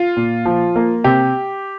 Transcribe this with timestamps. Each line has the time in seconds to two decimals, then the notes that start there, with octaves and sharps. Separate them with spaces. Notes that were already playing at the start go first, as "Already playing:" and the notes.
Already playing: F4
0.17 A#2
0.46 F3
0.76 A#3
1.04 C3 G4